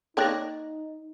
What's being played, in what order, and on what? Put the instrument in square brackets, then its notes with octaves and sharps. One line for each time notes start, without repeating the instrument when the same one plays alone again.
[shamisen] A#3 C#5 D5 [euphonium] D#4 [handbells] G5 F#6 A#6